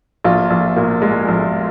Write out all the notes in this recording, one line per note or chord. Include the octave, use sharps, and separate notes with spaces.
A#1 F4
A#1
A#2
G#3
A#1